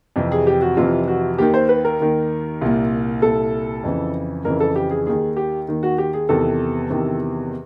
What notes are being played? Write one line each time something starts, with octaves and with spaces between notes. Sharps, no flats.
F2 C3 E3 G4
G#4
G4
F#4
F2 C3 E3 F4
F#4
D#2 D#3 G4
C5
B4
A#4
D#2 D#3
C2 A#2
C2 A#2 A4
F2 C#3 E3
F2 C#3 E3 A#4
A4
G4
G#4
D#2 D#3 G#4
G4
D#2 D#3
F#4
G4
G#4
E2 C3 D#3 A4
E2 C3 D#3